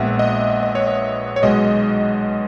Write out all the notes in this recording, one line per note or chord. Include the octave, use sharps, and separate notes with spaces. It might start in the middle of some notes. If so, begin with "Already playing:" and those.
Already playing: A#1 A#2 G#3 B3 E5 F#5
D#5
E5
D#5
C#5
D#5
C#5
B1 B2 G#3 D#5